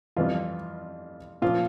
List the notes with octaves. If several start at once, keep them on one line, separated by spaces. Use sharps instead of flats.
F2 E3 G3 F4
A#2 F3 F4